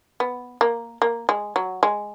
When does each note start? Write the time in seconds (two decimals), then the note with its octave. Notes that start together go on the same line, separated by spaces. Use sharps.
0.20 B3
0.61 A#3
1.02 A#3
1.29 G#3
1.56 F#3
1.83 G#3